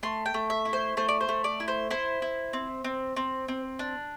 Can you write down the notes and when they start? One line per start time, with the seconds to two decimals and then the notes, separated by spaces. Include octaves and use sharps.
0.03 A3 C6
0.26 G5
0.34 A3
0.50 E5
0.65 E4
0.73 C5
0.97 A3 C5
1.08 D5
1.21 C5
1.29 A3
1.44 D5
1.60 E4
1.68 C5
1.90 E4 C5
2.22 E4
2.53 C4
2.84 C4
3.16 C4
3.48 C4
3.79 D4